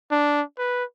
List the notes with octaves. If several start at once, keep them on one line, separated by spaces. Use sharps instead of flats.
D4
B4